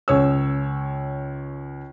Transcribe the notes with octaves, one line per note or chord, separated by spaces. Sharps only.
C#2 C#5 E6